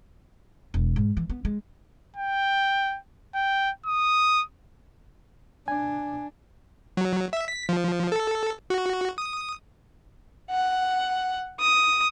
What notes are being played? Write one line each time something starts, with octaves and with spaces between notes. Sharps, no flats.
E1
G#2
E3
B3
G#3
G5
G5
D#6
D4 G#5
F#3
E5
B6
F3
A4
F#4
D#6
F#5
D#6